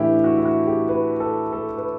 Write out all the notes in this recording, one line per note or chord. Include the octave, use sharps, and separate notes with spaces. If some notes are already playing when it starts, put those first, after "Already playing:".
Already playing: A2 E3 A3 D4 E4 G4
F#4
E4
F#4
G4
B4
A4
A4
B4